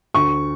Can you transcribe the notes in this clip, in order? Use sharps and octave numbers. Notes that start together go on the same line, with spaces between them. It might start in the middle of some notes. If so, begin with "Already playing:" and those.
D2 C#6